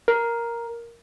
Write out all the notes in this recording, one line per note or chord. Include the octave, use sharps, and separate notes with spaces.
A#4